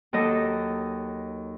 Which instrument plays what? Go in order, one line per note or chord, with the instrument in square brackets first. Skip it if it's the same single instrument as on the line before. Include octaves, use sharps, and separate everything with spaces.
[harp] D#2 F#3 A4 D#5 E6